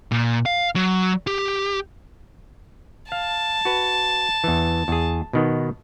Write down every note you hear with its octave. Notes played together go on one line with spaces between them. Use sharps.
A#2
F5
F#3
G4
F5 A5
F#4 B4
E2 E3
E2 G#4
B2 D#3 B3